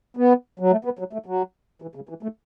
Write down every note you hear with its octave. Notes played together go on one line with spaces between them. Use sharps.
B3
F#3
A3
B3
F#3
A3
F#3
E3
C#3
E3
A3